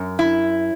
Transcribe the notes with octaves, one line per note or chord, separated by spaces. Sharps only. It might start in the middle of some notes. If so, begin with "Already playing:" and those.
Already playing: F#2
E4